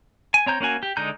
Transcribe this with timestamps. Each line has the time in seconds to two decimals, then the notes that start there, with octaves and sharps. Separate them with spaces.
0.34 G#5
0.46 C4 C#5 A#5 G6
0.60 A#3 C#4 F#4 G#5
0.83 G4
0.97 D3 G#3 D#4 A#5 G6